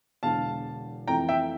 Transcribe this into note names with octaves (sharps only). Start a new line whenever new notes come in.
E1 E2 D3 F5 A5
F2 E3 A3 E4 G5 A#5
E5 G5